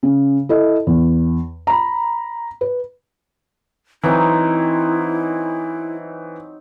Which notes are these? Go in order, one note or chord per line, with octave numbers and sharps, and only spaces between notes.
C#3
E4 A4 D#5
E2
A#5 B5
B4
E3 F#3 C4 D#4 E4